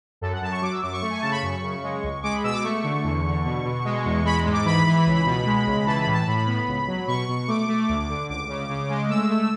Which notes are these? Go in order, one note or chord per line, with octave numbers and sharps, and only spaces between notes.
F#2 A4
F#5
F#2 A5
C#6
F#3 D6
E6
F#2 D6
C#6
A3
G#5
C#3 A5
B5
F#2 C#6
C#3
G#3
C#2
G#3 D6
B5
B2 E6
D6
A3 C#6
D3
E2
D3
B2
B2
G#3
E2
G#3 B5
G#2
D6
E3 B5
E3
C#2
B2
G#3
C#2
E3 A5
B5
A2
A5
A2 B5
B3
C#2
F#3
B2 C#6
B2
A3 D6
A3
D2
D3
C#2 D6
C#3
C#3
G#3
A3 E6
A3